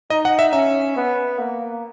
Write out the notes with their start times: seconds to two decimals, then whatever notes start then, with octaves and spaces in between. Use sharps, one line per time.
0.10 D#4 D#5
0.25 F#5
0.39 E5
0.53 C#4 E5
0.97 B3
1.38 A#3